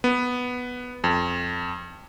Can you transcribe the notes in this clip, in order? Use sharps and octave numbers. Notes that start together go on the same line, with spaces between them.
B3
F2